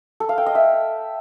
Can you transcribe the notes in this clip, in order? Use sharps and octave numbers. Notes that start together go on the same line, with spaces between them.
A4
F5
G5
D#5
E5